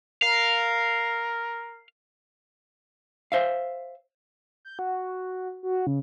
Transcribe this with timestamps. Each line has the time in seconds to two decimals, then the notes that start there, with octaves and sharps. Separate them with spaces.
0.22 A#4 F5
3.32 C5 E5 F5
4.65 G6
4.79 F#4
5.63 F#4
5.87 C#3